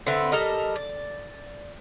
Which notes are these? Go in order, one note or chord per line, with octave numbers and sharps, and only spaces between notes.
D3 C4 B4 E5
G3 A4 A#4 D#5
D5